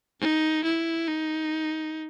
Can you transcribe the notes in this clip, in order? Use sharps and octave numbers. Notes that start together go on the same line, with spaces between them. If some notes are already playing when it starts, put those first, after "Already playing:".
D#4
E4
D#4